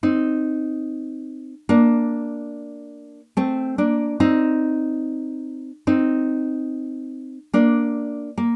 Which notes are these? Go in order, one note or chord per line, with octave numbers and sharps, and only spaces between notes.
C4 D#4
A#3 D4
A3 C4
A#3 D4
C4 D#4
C4 D#4
A#3 D4
A#3